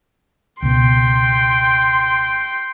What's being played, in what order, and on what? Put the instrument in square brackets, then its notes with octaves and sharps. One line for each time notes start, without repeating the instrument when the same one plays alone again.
[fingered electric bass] C#2 B2 [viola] G5 C6